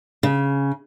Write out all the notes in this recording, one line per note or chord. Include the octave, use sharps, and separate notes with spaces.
C#3